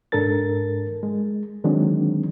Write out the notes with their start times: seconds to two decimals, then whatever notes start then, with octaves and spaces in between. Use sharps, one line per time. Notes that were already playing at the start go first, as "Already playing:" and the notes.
0.12 G#2 D4 A4 A#4 A6
1.03 G#3
1.64 D3 D#3 F#3 G#3 C4 D4